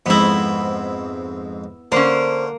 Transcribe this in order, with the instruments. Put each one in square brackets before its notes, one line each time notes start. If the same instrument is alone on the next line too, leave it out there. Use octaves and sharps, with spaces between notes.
[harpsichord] F2 G#2 C4 [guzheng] B3 E4
[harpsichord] D3 [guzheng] A#3 [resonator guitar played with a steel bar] C#4 C5